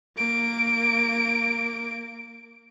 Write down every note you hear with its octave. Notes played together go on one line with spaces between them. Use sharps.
A#3 D7